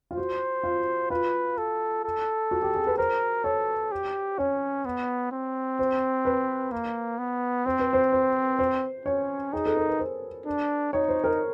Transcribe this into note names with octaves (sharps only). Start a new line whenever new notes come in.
F4
F#4 C5
F4
F4 B4
A4
A4
F#4
G4
G#4
B4
A#4 C5
A4 C#5
G4
C#4 C#5
B3
C4
C5
B4
A#3
B3
C4 C5
B4
C5
C5
C5
C#4 C#5
D#4 G#4
A4
A#4
B4
C5
D4
D#4 C#5
C5
A#4